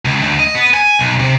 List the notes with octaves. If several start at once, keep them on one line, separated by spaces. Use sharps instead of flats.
C#2
D2
D#5
B3
G#5
B1
C3